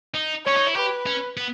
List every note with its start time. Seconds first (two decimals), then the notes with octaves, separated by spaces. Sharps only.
0.15 D#4
0.46 C#4 C#5
0.57 D#4
0.67 E4
0.76 G4 B4
1.06 C#4
1.37 B3